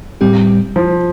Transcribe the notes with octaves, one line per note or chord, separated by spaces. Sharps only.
A2 G3 C4 G4
F3